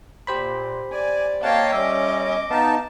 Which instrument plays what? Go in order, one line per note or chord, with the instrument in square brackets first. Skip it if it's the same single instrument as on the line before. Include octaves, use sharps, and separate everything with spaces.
[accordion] A#2 [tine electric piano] G4 C5 B5
[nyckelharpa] D5 [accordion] G#5
[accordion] A#3 C#5 F5 [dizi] D#5 [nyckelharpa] G5 A5
[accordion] G3 C#4 [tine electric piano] E5 [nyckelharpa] D6
[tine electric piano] B3 F5 [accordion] D#4 A5